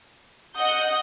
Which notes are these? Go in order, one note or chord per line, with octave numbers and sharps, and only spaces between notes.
D#5 F#5 D#6 G6